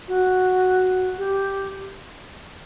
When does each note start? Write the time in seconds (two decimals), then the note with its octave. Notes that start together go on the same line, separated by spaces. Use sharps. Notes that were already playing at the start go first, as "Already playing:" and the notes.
0.08 F#4
1.18 G4